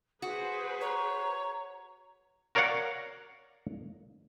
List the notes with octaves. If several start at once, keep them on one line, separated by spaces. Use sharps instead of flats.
F#4 G#4 B4 C5 D#6
C#5 A#5
F#4 A#4 C#5 D5 F5 F#5